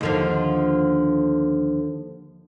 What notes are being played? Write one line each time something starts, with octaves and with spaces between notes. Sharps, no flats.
D#2 D3 F3